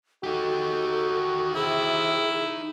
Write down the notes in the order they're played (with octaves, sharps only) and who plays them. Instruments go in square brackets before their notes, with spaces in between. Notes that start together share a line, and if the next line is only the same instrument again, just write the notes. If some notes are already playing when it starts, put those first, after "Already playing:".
[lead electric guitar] D#4 G4 [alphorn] F#4 [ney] A4
[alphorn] C3 [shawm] E4 [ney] G#4